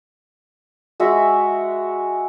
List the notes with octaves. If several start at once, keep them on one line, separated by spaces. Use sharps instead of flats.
G#3 F#4 E5